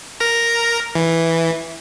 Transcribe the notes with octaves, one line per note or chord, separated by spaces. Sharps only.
A#4 A#5
E3